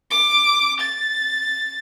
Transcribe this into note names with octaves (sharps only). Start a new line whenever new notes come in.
D6
A6